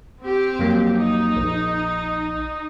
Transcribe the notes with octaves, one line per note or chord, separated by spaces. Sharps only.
C4 G4
F2 F#3 A#3
D#4
A#1